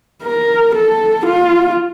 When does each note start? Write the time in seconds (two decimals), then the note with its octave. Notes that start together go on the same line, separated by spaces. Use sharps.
0.24 A#4
0.75 A4
1.26 F4